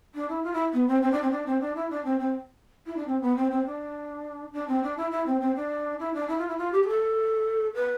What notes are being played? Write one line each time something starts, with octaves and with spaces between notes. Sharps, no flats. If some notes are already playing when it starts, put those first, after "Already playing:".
D4
E4
F4
E4
B3
C4
C4
D4
C4
D4
C4
D4
E4
D4
C4
C4
E4
D4
C4
B3
C4
C4
D4
D4
C4
D4
E4
E4
C4
C4
D4
E4
D4
E4
F4
E4
F4
G4
G4
A4
B4